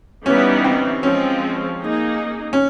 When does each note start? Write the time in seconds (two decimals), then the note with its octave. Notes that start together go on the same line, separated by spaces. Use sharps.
0.25 E3 G3 B3 C#4 D#4
0.64 C4
1.03 F3 G#3 C4 C#4
1.80 A#3 D#4 G#4
2.53 C#4